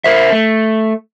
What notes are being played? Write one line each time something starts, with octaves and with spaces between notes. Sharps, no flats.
A#4 C5 E5
A3